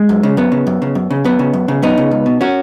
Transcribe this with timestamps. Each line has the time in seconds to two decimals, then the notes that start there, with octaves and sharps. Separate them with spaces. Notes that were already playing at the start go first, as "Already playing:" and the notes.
Already playing: G#3
0.09 F#2
0.23 C#3
0.37 F#2 B3
0.52 C#3
0.67 F#2
0.82 C#3
0.95 F#2
1.11 C#3
1.24 F#2 B3
1.39 C#3
1.53 F#2
1.68 C#3
1.82 F#2 B3 D#4
1.97 C#3
2.11 C#2
2.26 B2
2.41 C#4 F#4